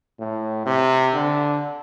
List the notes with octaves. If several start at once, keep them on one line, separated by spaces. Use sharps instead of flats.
A2
C3
D3